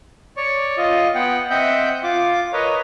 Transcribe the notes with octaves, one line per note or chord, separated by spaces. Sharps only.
C#5 D5 C#6
F4 D#5
B3 F#5 G5
C4 D#5 E5 F#5 G5 G6
F4 D6
A#4 B4 C#5 D#5